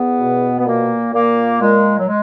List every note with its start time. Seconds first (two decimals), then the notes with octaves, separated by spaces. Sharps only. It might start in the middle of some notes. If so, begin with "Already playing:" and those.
Already playing: E2 B3
0.18 B2
0.59 B3
0.66 A#2 A#3
1.13 A#2 A#3
1.61 A#2 G#3
1.98 F#3
2.07 G#3